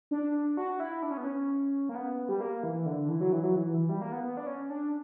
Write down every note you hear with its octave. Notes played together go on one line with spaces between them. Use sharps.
D4
F#4
E4
D4
C#4
B3
C#4
A#3
B3
G3
A#3
E3
D3
E3
F#3
E3
F#3
E3
E3
G3
A#3
B3
B3
D4
C#4
D4